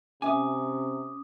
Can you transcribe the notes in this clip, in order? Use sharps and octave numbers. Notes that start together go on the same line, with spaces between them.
C3 C#4 E5 G#5 D6 D#6